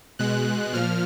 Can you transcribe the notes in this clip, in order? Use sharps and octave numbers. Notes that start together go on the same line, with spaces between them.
B2 G#3 F#6
A#2 F3 F6